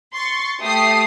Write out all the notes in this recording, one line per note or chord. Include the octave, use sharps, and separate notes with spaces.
C6 C#6 A6
A3 G4 D#6 C7